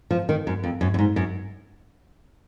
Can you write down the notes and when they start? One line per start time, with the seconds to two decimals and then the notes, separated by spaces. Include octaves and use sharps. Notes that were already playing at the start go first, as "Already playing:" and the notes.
0.11 F3
0.29 D#3
0.47 F#2
0.64 F2
0.81 F#2
0.94 F#2
0.99 G#2
1.16 F#2